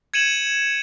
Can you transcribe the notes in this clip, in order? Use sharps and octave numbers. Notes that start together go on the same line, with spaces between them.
G#6 C#7 D#7 E7 F#7